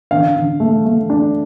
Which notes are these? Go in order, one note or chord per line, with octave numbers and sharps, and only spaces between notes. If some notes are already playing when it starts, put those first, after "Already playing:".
D3 F5
D3
A3
A3
D4